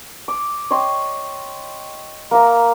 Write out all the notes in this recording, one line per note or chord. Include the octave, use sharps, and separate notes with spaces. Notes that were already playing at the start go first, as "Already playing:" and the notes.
D6
C#5 D#5 G5 C6
A#3 E5 A#5